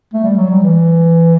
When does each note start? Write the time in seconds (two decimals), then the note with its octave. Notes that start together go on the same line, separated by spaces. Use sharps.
0.14 A3
0.24 G3
0.38 F#3
0.50 G3
0.63 E3